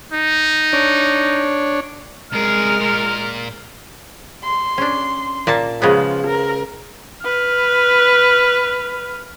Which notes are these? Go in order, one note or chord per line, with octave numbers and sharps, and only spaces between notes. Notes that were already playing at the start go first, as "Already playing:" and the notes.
D#4
D4 C#5
C2 G#3 G#4 A#4 F6
A#2
C6
C#4 D4
A#2 A#3 A5
C#3 F3 G#3 B3
A#4
B4 F6